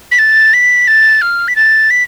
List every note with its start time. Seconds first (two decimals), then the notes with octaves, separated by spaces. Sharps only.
0.12 B6
0.19 A6
0.54 B6
0.88 A6
1.22 F6
1.48 B6
1.56 A6
1.90 B6